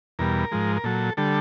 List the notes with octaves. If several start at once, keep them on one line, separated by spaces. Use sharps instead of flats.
E2 B2 G3 A#4
G#2 F3 G#3
A#4
A#2 F#3 A4
D3 G3 A4